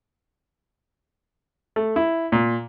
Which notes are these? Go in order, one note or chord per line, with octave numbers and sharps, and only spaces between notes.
A3
E4
A#2